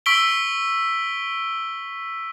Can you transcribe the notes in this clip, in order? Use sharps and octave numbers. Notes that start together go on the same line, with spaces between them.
C#6 E6 B6 D7 G7